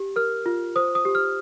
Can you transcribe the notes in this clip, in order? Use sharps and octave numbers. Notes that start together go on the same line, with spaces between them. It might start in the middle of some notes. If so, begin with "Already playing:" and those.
Already playing: G4
A#4 F6
F4
C5 D#6
D#6
G4
F6